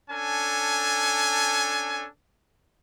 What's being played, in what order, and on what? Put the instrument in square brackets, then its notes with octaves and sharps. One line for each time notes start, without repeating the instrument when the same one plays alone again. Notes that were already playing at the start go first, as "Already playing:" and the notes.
[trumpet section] C#4 D4 A4 G#5